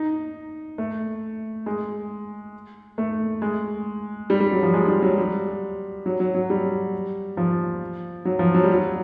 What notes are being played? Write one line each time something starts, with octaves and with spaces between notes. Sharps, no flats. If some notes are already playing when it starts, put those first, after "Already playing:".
Already playing: D#4
A3
G#3
A3
G#3
G3
G3
F#3
F3
G#3
G3
F#3
G3
F#3
F#3
F#3
G3
F3
F#3
F3
F#3
G3
F#3